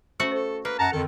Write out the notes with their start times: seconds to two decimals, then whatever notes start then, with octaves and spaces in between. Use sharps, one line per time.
0.20 A3 C#4 F#4 C5 F#5
0.32 A4 C5
0.65 A#3 B4
0.79 F#2 F#5 A5 A#5
0.92 F2 D3 D#3 A4